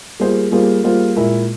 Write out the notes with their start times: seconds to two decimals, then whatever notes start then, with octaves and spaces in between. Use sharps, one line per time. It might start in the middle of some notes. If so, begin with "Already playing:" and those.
0.20 G3 A#3 F4 G#4 C5
0.51 G3 A#3 F4 G#4 C5
0.84 G3 A#3 F4 G#4 C5
1.16 A#2 G#3 E4 A#4 E5